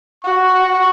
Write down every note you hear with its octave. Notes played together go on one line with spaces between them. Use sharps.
F#4 C#6